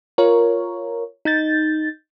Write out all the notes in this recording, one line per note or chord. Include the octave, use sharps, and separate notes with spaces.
F4 A#4 C#5
D#4 G6 A6